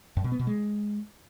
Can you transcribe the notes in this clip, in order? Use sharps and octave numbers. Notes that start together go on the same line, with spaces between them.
F#2
B2
B3
B2
G#3